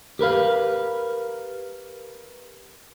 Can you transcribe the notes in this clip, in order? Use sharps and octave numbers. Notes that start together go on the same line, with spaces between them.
G4 A#4 B4 F5